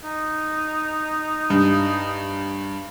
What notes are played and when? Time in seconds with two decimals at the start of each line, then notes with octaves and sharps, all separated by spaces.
0.04 D#4
1.50 G2